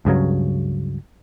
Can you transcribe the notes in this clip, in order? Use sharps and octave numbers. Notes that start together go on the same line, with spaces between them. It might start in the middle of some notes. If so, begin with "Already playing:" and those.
C#2 G2 C#3 F#3